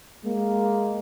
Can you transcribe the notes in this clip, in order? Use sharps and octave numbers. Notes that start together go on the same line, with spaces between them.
G#3 A#3